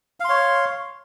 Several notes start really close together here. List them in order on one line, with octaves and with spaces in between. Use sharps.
F5 C6 C#5